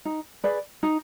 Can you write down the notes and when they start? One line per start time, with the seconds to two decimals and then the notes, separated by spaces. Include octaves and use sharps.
0.05 D#4
0.44 G#4 B4 D5
0.83 D#4